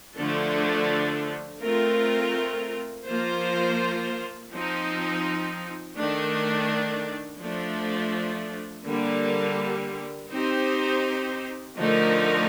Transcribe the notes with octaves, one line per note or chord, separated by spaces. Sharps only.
D3 F3 A3 D4 A4
A3 C4 F4 A#4
F3 A#3 F4 C5
F3 C4 D#4
D#3 A3 D4
F3 A3 D4
D3 G3 A#3
C4 D#4 G4 C5
D3 F3 A3 D#4 A#4